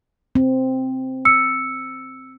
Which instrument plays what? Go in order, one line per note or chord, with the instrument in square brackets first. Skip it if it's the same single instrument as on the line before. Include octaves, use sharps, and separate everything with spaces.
[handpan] C4
[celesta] E6 C#7